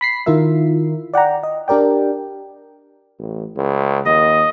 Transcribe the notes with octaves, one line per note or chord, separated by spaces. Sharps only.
B5 B6 C7
D#3 E4 F4 A#4 E5
D5 F#5 G5 A#5
D#5
D4 G4 A#4 D5 G5
A1
C#2
D#2 D#5